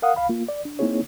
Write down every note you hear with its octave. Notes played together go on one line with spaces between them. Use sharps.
A#4 F5 F#5 D#6
C2 F5 B5
A#3 F4
D5
D4
A#3 C4 D#4 E4 G#4 C#5